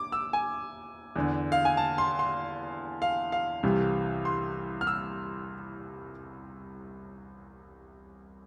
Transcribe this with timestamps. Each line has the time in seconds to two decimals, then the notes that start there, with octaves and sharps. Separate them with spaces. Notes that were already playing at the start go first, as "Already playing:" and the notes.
Already playing: D6
0.12 E6
0.33 G#5
1.16 E2 D3
1.52 F5
1.65 G#5
1.77 A5
1.98 C6
2.19 C6
3.02 F5
3.32 F5
3.63 C2 C3 E3
4.25 C6
4.81 F6
4.87 E6